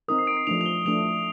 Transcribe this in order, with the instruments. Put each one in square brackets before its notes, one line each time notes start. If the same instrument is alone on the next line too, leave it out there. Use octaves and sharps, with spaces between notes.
[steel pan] C4 D#4 A#4 [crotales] D#6
[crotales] C7
D7
C7
[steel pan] F3 A3 D4 [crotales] F7
[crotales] F7
G7
[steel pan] F3 A3 D4 [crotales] F7